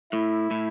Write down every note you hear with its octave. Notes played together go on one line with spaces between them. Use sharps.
A2 E4
A2